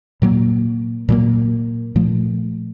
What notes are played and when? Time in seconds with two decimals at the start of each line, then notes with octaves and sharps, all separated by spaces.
0.22 A#2 F#3 A#3
1.09 A#2 F#3 A#3
1.96 A#2 F3 A3